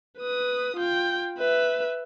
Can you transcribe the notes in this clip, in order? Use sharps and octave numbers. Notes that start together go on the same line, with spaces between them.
B4 D#6
F4 G5
B4 E5